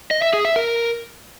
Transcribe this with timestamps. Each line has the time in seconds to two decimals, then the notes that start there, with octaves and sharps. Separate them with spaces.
0.11 D#5
0.22 E5
0.33 G#4
0.45 E5
0.56 A#4